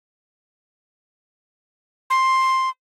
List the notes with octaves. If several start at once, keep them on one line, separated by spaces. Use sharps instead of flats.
C6